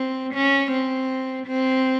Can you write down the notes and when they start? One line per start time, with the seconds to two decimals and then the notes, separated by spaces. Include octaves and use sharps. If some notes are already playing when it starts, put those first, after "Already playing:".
Already playing: C4
0.34 C#4
0.71 C4
1.47 C4